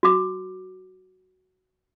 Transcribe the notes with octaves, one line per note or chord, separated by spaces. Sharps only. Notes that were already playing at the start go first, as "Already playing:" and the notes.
F#4 D6